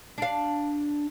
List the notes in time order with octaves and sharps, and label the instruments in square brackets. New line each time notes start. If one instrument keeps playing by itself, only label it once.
[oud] D4 F5